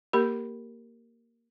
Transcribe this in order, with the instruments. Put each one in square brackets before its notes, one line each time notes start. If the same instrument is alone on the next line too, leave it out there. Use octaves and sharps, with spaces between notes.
[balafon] A#3 G4 A#4 B5